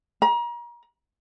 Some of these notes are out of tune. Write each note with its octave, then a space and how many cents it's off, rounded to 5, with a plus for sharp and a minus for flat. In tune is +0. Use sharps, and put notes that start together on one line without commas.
A#5 +35